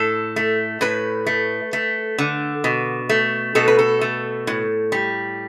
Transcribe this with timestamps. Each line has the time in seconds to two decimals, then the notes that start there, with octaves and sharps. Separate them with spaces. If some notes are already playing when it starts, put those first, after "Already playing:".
Already playing: A2 A4
0.36 A3
0.81 A2 B4
1.26 A3
1.73 A3
2.18 D3
2.64 B2
3.09 A3
3.55 B2 A4
3.68 B4
3.79 A4
4.01 A3
4.47 A2
4.92 G3